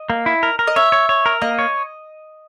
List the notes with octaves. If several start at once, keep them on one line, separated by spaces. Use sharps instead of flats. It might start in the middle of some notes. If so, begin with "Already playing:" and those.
Already playing: D#5
A#3
E4
A#4
A#4
D#5
C#5 E5
C#5
C#5
A#4
A#3 D#5
C#5